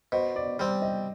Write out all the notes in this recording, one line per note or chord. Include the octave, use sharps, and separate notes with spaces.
B2 C5
D5
G3 C4 D5
D#5